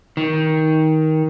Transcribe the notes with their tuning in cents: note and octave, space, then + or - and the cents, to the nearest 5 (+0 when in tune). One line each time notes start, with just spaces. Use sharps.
D#3 +15